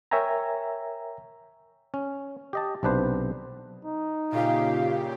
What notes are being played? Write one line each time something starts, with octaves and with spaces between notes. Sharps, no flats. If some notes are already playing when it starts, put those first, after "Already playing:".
A#4 C#5 E5 G5 G#5 A#5
C#4
G4 D#5 A5
B1 C3 D4 B4 C5
D#4
A#2 C#3 F4 G4 F5